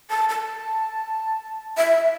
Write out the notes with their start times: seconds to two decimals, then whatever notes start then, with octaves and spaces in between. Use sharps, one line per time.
0.10 A5
0.29 A5
1.77 E5
2.02 E5